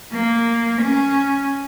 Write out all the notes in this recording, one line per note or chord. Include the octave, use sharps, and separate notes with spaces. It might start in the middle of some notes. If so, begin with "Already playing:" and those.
A#3
C#4